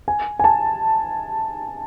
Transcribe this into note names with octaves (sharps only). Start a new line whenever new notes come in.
G#5
G#5
A5